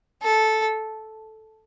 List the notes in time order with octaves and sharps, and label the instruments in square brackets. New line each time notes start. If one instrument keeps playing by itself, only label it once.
[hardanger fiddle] A4